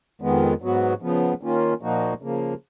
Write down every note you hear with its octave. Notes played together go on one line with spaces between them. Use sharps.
F2 D#3 G#3 B3
G#2 F#3 B3 F#4
C#3 F3 B3
D#3 A#3 C#4 F4
A#2 F3 A#3 D#4 F#4
C#3 F3 A#3